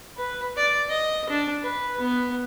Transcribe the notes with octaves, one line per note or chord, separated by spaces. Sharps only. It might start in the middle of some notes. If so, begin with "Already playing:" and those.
B4
D5
D#5
D4
B4
B3